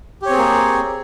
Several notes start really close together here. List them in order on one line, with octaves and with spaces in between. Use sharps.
G4 C#5 C4 G#4 A#3